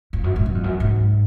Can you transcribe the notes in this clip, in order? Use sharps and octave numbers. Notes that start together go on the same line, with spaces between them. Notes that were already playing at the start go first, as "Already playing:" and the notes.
F2
F#2
G#2
F#2
F2
F#2
G#2